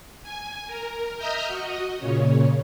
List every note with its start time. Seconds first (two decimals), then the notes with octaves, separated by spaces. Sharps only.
0.23 G#5
0.67 A#4
1.18 D#5 E5 A#5 D#6 F6 G6
1.47 F#4 D#5
1.99 A#2 C#3 C#4